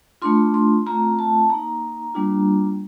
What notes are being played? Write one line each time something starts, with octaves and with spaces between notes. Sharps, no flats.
A3 D4 F4 C6
C6
A3 C4 F4 A#5
A5
A#3 D#4 A#5
G3 A#3 D4 F4